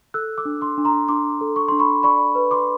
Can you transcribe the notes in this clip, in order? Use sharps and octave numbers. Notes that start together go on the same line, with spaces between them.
A4 E6 F#6
D6 E6
D4
C6 D6
D4
A#5 C6
D4 C6 D6
A4
C#6
D4 C6
B5 C#6
D5 B5 C#6
B4
C6 D6